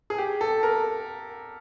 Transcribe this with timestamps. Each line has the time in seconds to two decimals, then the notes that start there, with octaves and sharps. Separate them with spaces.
0.10 G#4
0.18 G4
0.41 A4
0.63 A#4